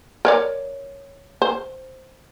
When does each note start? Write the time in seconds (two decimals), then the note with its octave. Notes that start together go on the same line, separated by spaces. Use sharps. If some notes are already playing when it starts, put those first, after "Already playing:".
0.25 A#4 C#5 D5
1.42 C5